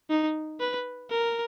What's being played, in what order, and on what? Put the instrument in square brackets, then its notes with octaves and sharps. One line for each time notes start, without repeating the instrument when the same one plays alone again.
[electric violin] D#4
B4
A#4